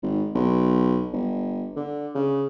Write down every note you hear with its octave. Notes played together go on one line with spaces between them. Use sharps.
G#1
B1
G1
D3
C#3